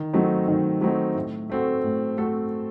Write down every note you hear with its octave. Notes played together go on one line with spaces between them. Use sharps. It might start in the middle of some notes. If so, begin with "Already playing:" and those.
Already playing: D#3
F#3 A3 C4 D#4
D#3
F#3 A3 C4 D#4
A2
A3 C4 F#4 A4
A2
A3 C4 F#4 A4